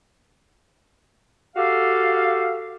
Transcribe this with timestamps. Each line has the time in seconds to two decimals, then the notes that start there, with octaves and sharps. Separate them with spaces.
1.57 F#4 G4 A4 F5